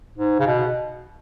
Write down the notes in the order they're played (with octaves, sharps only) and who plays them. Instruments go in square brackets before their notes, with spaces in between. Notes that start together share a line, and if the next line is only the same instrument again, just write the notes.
[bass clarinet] G#2
C#3
B2